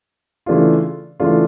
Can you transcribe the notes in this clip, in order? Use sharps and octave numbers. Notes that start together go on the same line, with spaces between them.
C#3 E3 A3 D4 F4
C#3 E3 A3 D4 F4